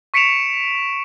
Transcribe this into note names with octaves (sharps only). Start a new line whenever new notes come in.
C#6 B6 C#7 D7 E7 F7